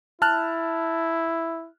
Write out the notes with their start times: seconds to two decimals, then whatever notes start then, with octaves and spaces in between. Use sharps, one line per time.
0.22 E4 A5 F6 F#6